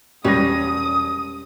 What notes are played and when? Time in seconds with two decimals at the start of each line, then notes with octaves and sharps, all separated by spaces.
0.24 E1 G3 C#4 G4 B4 D#6 A#6